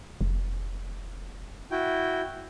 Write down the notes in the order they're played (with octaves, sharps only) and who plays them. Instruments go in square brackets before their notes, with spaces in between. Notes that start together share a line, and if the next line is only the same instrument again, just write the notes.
[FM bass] F1
[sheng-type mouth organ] E4 F#4 G5